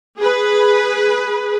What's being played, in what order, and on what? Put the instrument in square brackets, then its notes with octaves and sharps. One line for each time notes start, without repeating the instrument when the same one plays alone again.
[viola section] G#4 B4